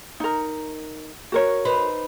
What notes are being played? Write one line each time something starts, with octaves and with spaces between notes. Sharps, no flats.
D#4 A#4
F#4 A#4 C#5
D#4 B4 C5